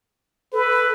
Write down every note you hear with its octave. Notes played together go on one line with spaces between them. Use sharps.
A4 B4